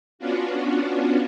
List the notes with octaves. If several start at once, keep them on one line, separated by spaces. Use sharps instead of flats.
B3 C#4 D4 F4 F#4